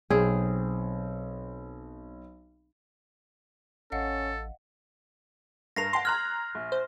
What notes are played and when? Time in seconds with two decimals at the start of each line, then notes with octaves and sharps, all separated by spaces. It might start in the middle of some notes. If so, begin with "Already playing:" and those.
0.10 B1 C4 G#4
3.92 A1 C#4 A4 D#5 F5 F#5
5.76 G2 A#4 A#6 C7 F7
5.93 F#5 G5 A5 C6
6.05 A#5 F6 F#6 G#6
6.55 A#1
6.72 C5